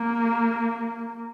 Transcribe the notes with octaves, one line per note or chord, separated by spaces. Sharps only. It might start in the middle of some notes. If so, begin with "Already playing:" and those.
Already playing: A#3